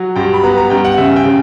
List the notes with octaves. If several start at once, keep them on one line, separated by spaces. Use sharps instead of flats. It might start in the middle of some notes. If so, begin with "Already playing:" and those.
Already playing: F#3
G2 G5
B5
B3 A#5
A#5
G2 G5
F#5
C#3 E5
G5
C#3